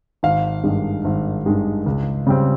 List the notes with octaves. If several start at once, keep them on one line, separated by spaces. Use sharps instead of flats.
G#1 F5
G2 D#3 G#3
G#1
G2 D#3 G#3
C#2
C#3 G3 C4